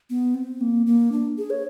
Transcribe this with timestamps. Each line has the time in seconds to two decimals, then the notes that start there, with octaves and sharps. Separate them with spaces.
0.10 B3
0.34 C4
0.61 A#3
0.87 A#3
1.12 D4
1.38 G#4
1.50 C#5